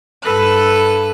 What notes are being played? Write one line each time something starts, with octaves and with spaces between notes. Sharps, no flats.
G2 A4 B4 F#6